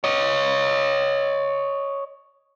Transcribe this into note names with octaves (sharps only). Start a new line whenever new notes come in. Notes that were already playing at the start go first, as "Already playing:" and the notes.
C#5 D#5